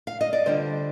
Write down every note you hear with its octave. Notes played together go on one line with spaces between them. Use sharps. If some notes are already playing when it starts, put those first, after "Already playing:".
F5
D#5
D5
D3 G3 D4 F4 C5